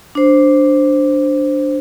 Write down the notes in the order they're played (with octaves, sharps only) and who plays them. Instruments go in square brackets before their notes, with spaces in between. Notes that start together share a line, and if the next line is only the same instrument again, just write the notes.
[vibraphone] D4 C5